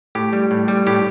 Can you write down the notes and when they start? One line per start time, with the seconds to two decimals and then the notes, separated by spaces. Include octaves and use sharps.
0.15 A2 G4
0.33 G3
0.51 A2
0.68 G3
0.87 A2 G4